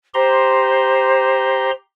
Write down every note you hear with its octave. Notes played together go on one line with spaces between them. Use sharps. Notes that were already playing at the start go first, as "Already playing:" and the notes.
G4 C5 A#5 C6